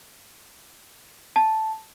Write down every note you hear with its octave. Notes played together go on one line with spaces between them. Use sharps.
A5